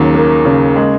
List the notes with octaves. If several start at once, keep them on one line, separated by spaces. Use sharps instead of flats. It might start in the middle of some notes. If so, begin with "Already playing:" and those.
Already playing: D#2 C#3 F#3 A#3
A#3
C#3
G#3